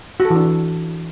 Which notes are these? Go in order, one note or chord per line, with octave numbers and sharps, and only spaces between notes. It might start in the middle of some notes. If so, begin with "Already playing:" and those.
F#4
A4
E3
D4